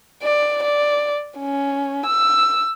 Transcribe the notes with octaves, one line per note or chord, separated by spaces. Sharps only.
D5
D5
C#4
E6